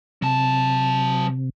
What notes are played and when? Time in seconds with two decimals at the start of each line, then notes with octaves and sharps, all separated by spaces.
0.22 C3 F#3 A5